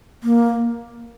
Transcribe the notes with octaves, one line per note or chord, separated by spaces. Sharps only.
A#3